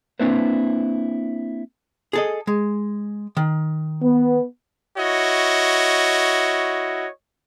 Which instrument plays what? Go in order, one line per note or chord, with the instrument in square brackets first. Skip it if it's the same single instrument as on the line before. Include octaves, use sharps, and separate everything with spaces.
[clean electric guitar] A#3 C4 D4 E4 B4 C5
[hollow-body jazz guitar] G#4 A4 D#5
G#3
D#3
[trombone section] B3
[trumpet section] E4 F#4 C#5 D#5